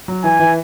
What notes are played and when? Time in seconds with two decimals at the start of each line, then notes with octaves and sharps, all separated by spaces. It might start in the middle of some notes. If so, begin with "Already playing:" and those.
0.08 F#3
0.24 E3 G#5
0.39 E3